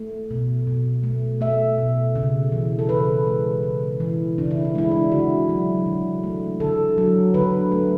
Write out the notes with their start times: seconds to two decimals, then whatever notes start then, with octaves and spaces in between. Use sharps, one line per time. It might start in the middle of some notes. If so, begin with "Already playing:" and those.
Already playing: A3
0.31 B2
0.67 B2
1.04 A3
1.41 A3 E5
1.78 B2
2.15 C#3
2.52 E3
2.79 A4
2.89 C#3 B4
3.26 G#3
3.63 C#3
4.00 E3
4.38 C#3 D4
4.51 E4
4.65 D4
4.75 G#3 E4
4.91 D4
5.11 D3 F#4
5.49 F#3
5.86 D3
6.23 A3
6.60 D3 A4
6.98 F#3
7.34 D3 B4
7.71 A3